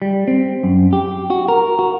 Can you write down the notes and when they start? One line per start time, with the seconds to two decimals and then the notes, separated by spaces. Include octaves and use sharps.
0.02 G3
0.28 C4
0.63 F#2
0.93 G4
1.30 F#4
1.48 A#4
1.79 F#4